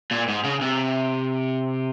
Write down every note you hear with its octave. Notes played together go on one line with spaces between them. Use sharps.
A#2
G#2
C#3
C3